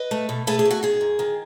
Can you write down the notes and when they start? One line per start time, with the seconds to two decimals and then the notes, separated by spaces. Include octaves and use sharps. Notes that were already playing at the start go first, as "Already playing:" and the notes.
Already playing: B4 D#5
0.11 A3
0.29 B2
0.47 A3 G#4 B4
0.59 G#4
0.65 B2
0.71 F#4
0.83 D#3 G#4
1.01 F#2
1.19 D#3